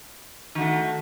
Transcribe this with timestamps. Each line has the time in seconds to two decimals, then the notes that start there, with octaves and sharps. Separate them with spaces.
0.55 D#3
0.58 F#4
0.61 A3